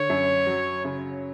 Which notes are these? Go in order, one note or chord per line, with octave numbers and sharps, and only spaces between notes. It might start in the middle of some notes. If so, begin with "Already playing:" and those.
Already playing: D3 C#5
F#2
F#3
C#3